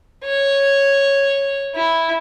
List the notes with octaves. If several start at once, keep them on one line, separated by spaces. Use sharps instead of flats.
C#5
E4